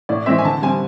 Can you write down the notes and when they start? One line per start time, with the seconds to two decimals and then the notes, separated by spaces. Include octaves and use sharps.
0.09 A2 D5
0.26 E3 G#3 C4 E5
0.38 G#5
0.44 D3 A5
0.62 G3 C4 G#5